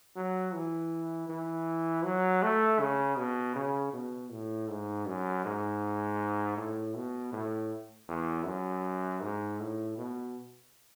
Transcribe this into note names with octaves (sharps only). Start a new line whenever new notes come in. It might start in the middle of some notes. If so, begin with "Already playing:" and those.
F#3
E3
E3
F#3
A3
C#3
B2
C#3
B2
A2
G#2
F#2
G#2
A2
B2
A2
E2
F#2
G#2
A2
B2